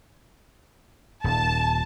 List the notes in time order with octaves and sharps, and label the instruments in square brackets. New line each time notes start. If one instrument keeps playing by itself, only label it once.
[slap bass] D#1 [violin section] A5